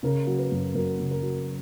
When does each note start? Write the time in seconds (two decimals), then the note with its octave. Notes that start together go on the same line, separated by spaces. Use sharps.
0.03 C#3 A#4
0.27 F#3
0.39 B4
0.51 F#2
0.74 F#2 A#4
0.99 C#3
1.11 A#4
1.22 F#3